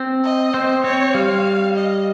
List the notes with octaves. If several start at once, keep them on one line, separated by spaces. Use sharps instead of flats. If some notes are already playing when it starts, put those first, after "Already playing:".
Already playing: C4
D#5
C4 C5
C4 C#5
G3 F5
D#5